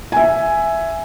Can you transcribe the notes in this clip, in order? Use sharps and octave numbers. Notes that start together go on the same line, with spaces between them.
E5 G#5